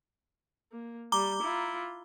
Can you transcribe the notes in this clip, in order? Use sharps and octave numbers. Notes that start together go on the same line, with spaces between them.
A#3
G3 A#5 D6 G7
E4 F4